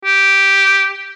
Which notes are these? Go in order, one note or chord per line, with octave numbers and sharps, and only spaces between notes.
G4